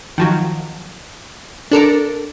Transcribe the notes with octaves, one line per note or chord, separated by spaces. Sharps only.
D#3 F3 F#3
D4 A4 A#4